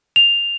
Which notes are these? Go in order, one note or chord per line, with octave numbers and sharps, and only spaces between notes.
F7